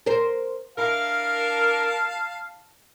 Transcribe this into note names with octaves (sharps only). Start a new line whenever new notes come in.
A#4 C5
D4 E4 A#4 F5 A5